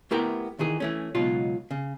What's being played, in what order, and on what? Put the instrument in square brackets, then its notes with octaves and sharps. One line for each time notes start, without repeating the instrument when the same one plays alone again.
[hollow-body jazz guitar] A3 B3 E4 G4 A#4 G5
D#3 E3 G#4
E3 A3 C#4
C#2 B2 F#3 D#4 F4
C#3